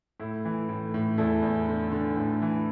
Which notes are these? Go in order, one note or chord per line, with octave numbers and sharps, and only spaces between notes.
A2 E4
E3
A2
A2
E2 E4 A4
E2
D3
D3
A2
E3